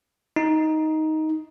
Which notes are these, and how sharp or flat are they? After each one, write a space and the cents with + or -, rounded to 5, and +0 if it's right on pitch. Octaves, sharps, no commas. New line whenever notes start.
D#4 +10